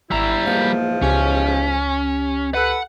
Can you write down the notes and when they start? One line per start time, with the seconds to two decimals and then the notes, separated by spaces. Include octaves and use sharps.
0.11 G#1 G3 E4 A#5 E6
0.46 E2 G#2 F3 A#3 F5
1.02 C#2 C#4 G4 B6
2.54 A4 B4 F#5